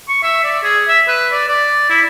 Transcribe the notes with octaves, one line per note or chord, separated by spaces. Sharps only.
C#6
E5
D5
G#4
E5
B4
D5
D5
E4